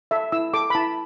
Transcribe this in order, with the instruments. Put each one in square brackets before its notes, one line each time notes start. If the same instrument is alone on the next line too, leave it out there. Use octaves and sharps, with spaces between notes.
[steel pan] A4 E5
E4 E6
A4 D6
B5
E4 A5